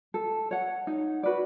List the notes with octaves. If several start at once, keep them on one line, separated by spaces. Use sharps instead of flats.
A4
C#5 F#5
D#4
F#4 B4 D5